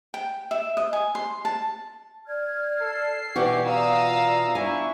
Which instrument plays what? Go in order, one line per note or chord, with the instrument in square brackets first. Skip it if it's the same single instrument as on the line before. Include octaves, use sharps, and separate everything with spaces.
[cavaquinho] G5
E5
D#5
G#5
C6
A5
[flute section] D5 F6 G#6
[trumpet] A4 [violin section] C7
[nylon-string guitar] B2 E3 F#4 [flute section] E4 D5 [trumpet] G4
[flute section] F4 D5 [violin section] F5 D#6 E6 [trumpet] A#5
[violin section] D4 C#6 [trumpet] E4 [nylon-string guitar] G#5